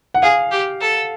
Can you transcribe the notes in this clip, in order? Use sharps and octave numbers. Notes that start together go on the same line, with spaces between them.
F#5
G#4 F5
G4
A4